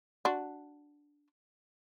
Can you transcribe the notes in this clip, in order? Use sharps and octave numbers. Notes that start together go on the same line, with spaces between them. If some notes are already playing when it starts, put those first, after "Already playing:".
D4 F#4